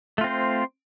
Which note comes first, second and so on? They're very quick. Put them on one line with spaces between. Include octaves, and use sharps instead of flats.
A3 F4 C4 C5